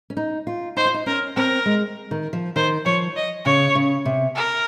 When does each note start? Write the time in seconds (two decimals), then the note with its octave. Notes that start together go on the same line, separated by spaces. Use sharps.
0.10 C#4
0.17 D#4
0.47 F4
0.76 D#4 C5
0.85 F4
0.94 D#4
1.06 C#4 A#4
1.36 C4 A#4
1.66 G#3
2.11 D#3
2.33 F3
2.56 D#3 C5
2.85 F3 C#5
3.16 D#5
3.45 C#3 C#5
3.75 C#3
4.05 C3
4.35 A#4